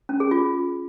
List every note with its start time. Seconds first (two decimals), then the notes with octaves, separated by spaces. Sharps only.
0.09 C#4
0.20 G#4
0.31 F4